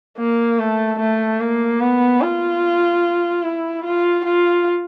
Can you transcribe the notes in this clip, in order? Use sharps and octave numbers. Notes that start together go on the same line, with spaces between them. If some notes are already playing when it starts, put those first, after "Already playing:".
A#3
A3
A3
A#3
B3
F4
E4
F4
F4